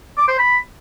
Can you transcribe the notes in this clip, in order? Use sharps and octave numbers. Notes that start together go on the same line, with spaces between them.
D6
C5
B5